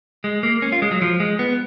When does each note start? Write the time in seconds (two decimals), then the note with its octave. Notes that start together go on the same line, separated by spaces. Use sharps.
0.24 G#3
0.43 A#3
0.62 C#4
0.72 F4
0.82 G#3
0.91 F#3
1.02 F3
1.20 G#3
1.39 B3